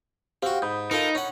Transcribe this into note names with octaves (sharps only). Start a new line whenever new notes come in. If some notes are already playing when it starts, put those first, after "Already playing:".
C4 F#4 G4 F5
G#2 B5 D#6 G6
D#4 F4 A4 A#4
C#4 F#5